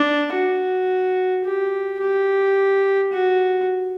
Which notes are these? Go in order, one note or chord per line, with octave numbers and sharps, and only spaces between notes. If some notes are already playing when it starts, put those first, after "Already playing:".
Already playing: D4
F#4
G4
G4
F#4